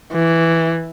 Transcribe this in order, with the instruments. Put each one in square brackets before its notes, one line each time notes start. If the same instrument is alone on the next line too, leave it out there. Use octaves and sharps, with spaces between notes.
[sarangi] E3